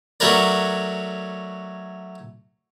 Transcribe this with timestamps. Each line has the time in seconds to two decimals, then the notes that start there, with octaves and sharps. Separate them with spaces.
0.20 F#3 A3 C#4 A#4 B4 D5